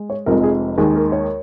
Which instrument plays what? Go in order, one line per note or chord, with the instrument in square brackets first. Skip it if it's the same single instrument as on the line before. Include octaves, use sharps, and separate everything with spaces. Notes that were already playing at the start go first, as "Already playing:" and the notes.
Already playing: [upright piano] G#3
C#5
F1 F2 F3 G#3 A#4
G#4
D#2 D#3 G#3 G#4
A#4
C#5